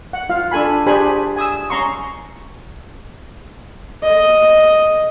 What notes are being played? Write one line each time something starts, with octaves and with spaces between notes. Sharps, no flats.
F#5
F4 F5
D4 A4 G#5 B5
D4 G4 G#4 C5 G#5 B5
G#5 D#6 E6
C#4 A#5 C6 C#6
D#5